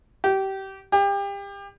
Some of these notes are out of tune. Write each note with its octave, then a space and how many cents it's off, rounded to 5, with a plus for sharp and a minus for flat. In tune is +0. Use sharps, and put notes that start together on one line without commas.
G4 -25
G4 +30